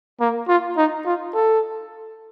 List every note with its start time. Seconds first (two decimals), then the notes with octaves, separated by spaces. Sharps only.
0.20 A#3
0.48 F4
0.77 D#4
1.06 F4
1.34 A4